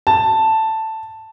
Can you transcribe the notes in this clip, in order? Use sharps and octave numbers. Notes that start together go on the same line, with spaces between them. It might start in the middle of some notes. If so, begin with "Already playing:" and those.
A5